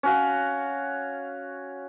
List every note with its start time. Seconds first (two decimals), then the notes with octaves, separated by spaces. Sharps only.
0.03 C#4 F#4 F5